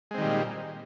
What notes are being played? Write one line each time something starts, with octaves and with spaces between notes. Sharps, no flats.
A#2 D#3 G3 G#3 C4